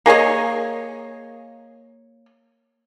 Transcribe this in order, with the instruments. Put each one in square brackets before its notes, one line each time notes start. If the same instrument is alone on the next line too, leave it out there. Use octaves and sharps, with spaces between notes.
[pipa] A#3 G#4 C#5 D#5